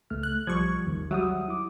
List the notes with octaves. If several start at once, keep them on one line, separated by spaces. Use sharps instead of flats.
C#2 A3 F6
F#6
B1 F3 G3 C#6 G#6
A1 D#2 D#3
F#3 G3 E5 F#5 D#6
E4 D6